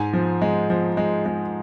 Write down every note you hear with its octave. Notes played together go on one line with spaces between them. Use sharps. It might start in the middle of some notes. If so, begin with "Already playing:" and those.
Already playing: G#2 G#5
F3
G#3
F3
G#3
G#3